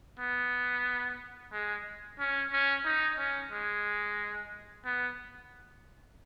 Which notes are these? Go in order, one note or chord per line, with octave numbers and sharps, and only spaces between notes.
B3
G#3
C#4
C#4
D#4
C#4
G#3
B3